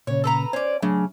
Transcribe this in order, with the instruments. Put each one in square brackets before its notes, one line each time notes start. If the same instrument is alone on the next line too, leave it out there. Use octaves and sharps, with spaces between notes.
[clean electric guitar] A#2 C#3 [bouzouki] C#5
[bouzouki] A4 B4 A#5
[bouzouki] C#4 D5 [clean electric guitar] C5
[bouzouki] C#3 [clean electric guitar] F#3 A3 D4